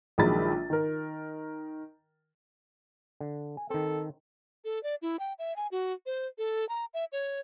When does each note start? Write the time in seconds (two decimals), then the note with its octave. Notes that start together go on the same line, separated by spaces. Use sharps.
0.18 A#1 D#3 F#3 G#3 B5 A6
0.70 D#3 A#4
3.20 D3
3.57 G#5
3.70 D#3 C4 A4
4.65 A4
4.83 D5
5.02 E4
5.19 G5
5.39 E5
5.56 G#5
5.71 F#4
6.06 C5
6.38 A4
6.69 A#5
6.94 E5
7.12 C#5